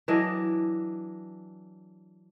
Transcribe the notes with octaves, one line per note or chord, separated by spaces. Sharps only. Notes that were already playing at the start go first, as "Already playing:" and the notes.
E3 F#3 D4 D#5